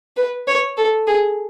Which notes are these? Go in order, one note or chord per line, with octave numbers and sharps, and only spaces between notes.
B4
C#5
A4
G#4